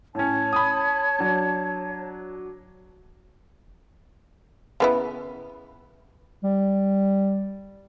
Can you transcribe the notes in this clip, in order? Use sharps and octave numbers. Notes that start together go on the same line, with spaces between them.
A2 C#4 C#5 A5
B5 D#6
F#3 D4
C#3 B3 E4
G3